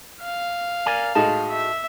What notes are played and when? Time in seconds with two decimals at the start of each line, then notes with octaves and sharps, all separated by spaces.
0.22 F5
0.86 A#4 D5 G#5
1.15 A2 G#3 D#4 F#4 A5
1.51 E5